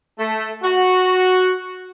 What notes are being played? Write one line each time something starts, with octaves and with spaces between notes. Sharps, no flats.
A3
F#4